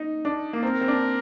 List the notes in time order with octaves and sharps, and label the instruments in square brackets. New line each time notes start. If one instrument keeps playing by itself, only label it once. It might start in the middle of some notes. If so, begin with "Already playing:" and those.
Already playing: [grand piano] D#4
D4
A#3
[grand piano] C4 [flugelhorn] A#4
[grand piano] C4
D4